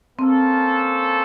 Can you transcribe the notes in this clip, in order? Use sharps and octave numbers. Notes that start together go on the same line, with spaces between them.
A#3 C4 C#4 A4 C5